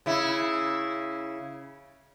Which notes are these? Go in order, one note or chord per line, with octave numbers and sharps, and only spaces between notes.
C#3 E4